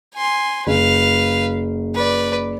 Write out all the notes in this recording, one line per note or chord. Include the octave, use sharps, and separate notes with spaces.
G#5 C6
F#1 B4 F5
B4 D5